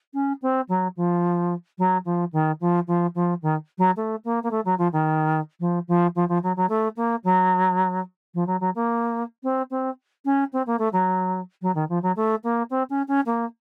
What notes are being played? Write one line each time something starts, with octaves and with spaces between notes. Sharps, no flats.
C#4
C4
F#3
F3
F#3
F3
D#3
F3
F3
F3
D#3
F#3
A3
A#3
A#3
A3
F#3
F3
D#3
F3
F3
F3
F3
F#3
F#3
A3
A#3
F#3
F3
F#3
F#3
A#3
C4
C4
C#4
C4
A#3
A3
F#3
F#3
D#3
F3
F#3
A3
A#3
C4
C#4
C#4
A#3